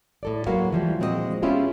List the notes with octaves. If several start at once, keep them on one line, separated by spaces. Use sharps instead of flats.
A2 A4 D5
F#3 G#3 A#3 F#4 B4 F5
E3 F3 G3
A#2 G#3 C4 F#4 B4 D#5
B3 C#4 E4 F4 G4 G#4